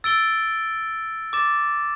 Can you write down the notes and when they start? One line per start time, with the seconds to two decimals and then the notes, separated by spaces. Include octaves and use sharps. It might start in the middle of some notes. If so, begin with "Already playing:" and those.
0.04 E6 A6 D7 G7
1.33 D6 A6 E7